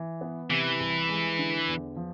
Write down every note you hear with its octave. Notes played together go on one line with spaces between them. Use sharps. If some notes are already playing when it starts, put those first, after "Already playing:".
Already playing: E3
B3
C3 E3
C2
G#3
D3
E2
F3